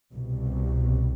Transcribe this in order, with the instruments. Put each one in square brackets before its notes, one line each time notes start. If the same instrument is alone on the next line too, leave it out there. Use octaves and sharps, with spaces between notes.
[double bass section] C2 B2